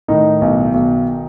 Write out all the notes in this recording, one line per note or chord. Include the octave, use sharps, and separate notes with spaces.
A2 D#3 D#4
B1
B1